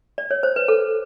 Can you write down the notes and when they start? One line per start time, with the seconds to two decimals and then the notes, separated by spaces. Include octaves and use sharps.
0.18 D5
0.31 C#5
0.43 C5
0.56 B4
0.68 A4